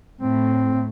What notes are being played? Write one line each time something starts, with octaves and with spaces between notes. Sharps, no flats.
A2 C4